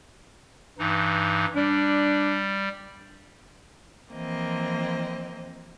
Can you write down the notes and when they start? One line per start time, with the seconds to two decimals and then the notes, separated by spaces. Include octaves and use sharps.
0.79 G2 E3 D#4
1.55 G3 D4
4.11 E3 F3 A#3 C4 D#5